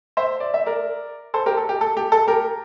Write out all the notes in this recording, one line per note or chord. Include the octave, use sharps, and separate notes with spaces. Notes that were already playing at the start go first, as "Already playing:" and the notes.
C5 E5
D5
E5
A#4 D5
A4 C5
G4 A#4
A4
G4
A4
G4
A4
G4 A#4